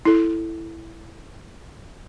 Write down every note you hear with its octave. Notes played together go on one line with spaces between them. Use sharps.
E4 A4